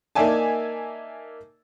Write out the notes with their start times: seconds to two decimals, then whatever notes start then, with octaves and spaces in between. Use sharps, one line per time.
0.15 A#3 D#4 D5 E5 G#5 A5